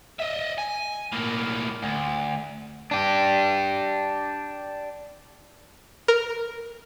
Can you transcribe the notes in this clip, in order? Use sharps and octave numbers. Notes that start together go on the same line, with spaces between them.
D#5 E5
G#5
A2 A#3
D2
D4 G4
A#4